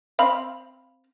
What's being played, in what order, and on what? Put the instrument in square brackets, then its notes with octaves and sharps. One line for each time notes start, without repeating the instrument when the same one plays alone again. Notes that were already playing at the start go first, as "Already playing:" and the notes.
[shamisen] C4 F5 B5